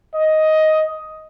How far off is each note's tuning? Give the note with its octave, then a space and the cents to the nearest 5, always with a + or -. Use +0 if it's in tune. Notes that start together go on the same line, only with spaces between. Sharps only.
D#5 +10